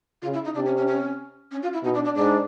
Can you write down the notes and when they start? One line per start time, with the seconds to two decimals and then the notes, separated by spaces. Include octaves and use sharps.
0.22 C#3 F4
0.34 E4
0.45 D#4
0.55 C3 D4
0.66 C#4
0.77 C#4
0.88 C#4
1.51 C#4
1.63 F4
1.73 E4
1.84 B2 D#4
1.94 D4
2.05 D4
2.16 G#2 D4